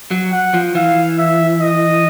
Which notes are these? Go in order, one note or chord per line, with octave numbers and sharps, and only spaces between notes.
F#3
F#5
F3
E3 F5
E5
D#5